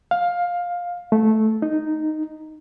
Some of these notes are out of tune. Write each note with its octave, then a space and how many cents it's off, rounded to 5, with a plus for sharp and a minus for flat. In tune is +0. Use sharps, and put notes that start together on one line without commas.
F5 +15
A3 -10
D#4 -5